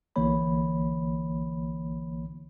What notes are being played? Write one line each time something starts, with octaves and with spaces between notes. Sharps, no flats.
A#1 D3 E3 A#3 C#5 B5